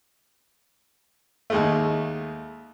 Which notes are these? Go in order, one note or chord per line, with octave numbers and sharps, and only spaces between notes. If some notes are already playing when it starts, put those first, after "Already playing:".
D#2 G#3 A3